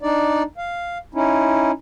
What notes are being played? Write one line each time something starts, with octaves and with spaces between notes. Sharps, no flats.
D4 D#4 D5
F5
C#4 D#4 E4